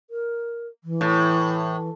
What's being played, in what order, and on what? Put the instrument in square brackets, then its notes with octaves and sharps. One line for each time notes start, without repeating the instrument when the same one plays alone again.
[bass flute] A#4
E3
[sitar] A2